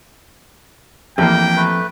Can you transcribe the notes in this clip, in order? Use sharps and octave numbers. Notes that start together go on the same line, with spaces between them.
A1 F2 A#3 G5
A3 B4